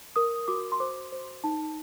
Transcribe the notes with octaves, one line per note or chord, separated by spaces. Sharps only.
A#4 D#6
F#4 D6
C6
C5 D6
C5
D#4 A5